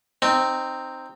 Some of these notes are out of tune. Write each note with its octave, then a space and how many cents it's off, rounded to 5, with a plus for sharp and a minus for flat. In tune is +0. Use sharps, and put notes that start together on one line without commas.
C4 +0 D#4 -20